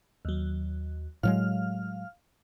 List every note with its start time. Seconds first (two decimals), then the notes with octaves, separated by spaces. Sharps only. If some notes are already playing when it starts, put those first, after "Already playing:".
0.25 D#2 F#3
1.23 A2 F#3 G#3 F5 F6